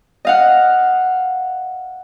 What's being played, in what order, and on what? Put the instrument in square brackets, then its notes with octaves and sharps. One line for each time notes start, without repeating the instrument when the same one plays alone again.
[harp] D#5 F5 F#5